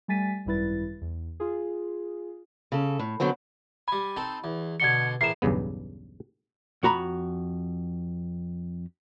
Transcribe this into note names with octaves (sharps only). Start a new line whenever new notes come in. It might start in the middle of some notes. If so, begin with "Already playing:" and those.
G3 A3 G#5 A6 B6 D#7
G#1 F#2 G3 E4 B4 A6
E2
F4 G#4
C#3 A4
A2
D3 F#3 B3 C4
G3 G#5 B5
C4 D#4 A4
E2
B2 D3 C6 G#6 C#7
E2 A2 A#4 C7 E7
B1 E2 G2 C#3 B3
F2 F#4 A#5 B5